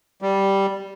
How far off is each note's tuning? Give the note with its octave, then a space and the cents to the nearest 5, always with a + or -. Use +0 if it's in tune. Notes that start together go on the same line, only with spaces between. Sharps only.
G3 -5